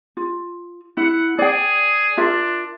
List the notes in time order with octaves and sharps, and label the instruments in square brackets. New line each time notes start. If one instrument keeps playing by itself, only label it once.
[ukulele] F4
[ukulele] E4 [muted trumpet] F#5
[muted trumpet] G#4 [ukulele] D5 G5
[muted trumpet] D4 [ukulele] F4 A#4 E5